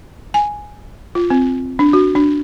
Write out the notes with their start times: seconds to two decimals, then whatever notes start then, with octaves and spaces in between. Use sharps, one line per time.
0.34 G#5
1.15 F4
1.30 C4
1.79 D4
1.93 F#4
2.15 D4